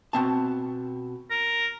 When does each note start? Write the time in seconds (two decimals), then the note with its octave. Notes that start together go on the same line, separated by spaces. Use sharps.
0.13 B2 C4 A5
1.30 A#4